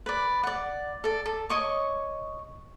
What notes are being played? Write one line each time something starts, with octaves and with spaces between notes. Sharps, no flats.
B4 D5
D5 F#5
A4 D5
A4
C#5 D#5 C#6 D6